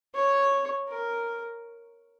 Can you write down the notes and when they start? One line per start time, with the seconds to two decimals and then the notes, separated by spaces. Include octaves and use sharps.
0.15 C#5
0.89 A#4